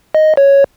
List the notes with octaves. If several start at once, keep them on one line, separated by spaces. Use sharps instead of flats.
D#5
C#5